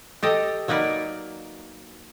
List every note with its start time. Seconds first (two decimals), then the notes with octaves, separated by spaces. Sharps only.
0.22 G4 A4 D#5
0.68 F#3 A#3 D#4 B4 D5